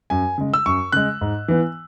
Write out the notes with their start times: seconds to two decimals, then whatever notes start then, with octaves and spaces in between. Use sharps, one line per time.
0.10 F#2 G#5
0.38 C#3 G#3
0.54 E6
0.66 F#2 C#6
0.92 C#3 G#3 F#6
1.21 G#2
1.48 E3 B3